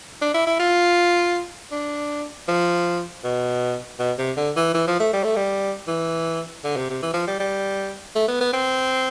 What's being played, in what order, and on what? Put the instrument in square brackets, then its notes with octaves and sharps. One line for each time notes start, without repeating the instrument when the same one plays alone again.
[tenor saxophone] D4
E4
E4
F4
D4
F3
B2
B2
C3
D3
E3
E3
F3
A3
G3
A3
G3
E3
D3
C3
C3
E3
F3
G3
G3
A3
B3
B3
C4